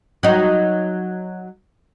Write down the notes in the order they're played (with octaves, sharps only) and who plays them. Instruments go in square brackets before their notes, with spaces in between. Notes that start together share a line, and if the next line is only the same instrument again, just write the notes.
[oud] F#3 D#4